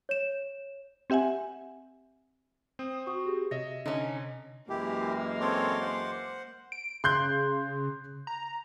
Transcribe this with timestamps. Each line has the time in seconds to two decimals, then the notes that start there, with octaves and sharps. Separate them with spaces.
0.09 C#5 E7
1.10 C4 G4 E5 F#5 G#5
2.79 C4 C5 D#6
3.07 F#4 C#6 D#6
3.26 G4 G#4
3.51 C3 C#5 D#5 E5 A#6
3.86 D3 C#4 D#4
4.69 F#2 E3 G#3 A#3 E4 G4
5.41 C4 A4 C#5 C6 D6
5.81 C5 F#5
6.72 D7
7.04 C#3 C6 F#6 G6
8.27 A#5